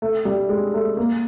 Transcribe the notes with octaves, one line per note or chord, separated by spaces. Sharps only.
A3
G3
G#3
A3
A#3